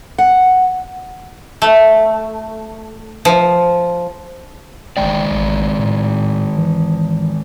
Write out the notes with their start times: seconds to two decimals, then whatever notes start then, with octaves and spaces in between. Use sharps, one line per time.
0.18 F#5
1.62 A3
3.25 F3
4.97 G1 D#3 G#3 D5 G5
5.31 A1
5.79 A2
6.58 E3